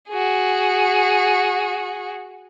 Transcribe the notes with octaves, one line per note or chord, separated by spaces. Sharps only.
F#4 G#4